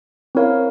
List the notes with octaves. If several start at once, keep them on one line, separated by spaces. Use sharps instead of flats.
C4 E4 A#4 C#5 F5